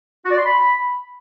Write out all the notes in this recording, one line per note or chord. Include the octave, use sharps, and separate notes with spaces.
F#4
D5
C6
B5